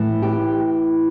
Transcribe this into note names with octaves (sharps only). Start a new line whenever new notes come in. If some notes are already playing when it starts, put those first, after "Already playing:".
Already playing: A2 E3
G4